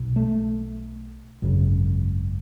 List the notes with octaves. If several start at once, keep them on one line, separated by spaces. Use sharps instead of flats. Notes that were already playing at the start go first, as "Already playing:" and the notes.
Already playing: B1 B2
A3
G#1 F#2 C#3